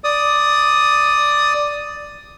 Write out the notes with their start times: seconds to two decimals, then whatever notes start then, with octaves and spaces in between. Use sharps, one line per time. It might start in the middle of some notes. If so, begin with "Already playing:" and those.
0.04 D5 D#6